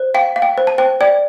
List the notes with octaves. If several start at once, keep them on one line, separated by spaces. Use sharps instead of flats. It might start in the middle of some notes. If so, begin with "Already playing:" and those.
Already playing: C5
F5 G5
F5
G5
C5
A5
C5 G5
D5 G5